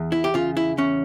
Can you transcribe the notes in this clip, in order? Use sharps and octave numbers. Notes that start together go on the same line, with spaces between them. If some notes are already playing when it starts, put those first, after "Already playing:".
Already playing: E2
E4
G4
C#3 F4
E4
E2 C#4